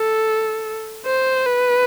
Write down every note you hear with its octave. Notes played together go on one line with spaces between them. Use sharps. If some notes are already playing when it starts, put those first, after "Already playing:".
Already playing: A4
C5
B4